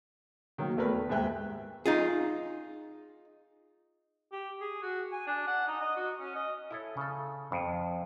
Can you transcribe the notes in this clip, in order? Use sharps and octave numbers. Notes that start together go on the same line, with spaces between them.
D#3 F#3 A#3
E2 A3 A#4 B4
B4
D#2 G#2 E5 G5 F#6
D#4 F4 G#4
G4
G#4
F#4
G#5
D4
F#5
D#4
D#5
F#4
C#4
D#5
E4 A4 C#5
C#3 A4
F2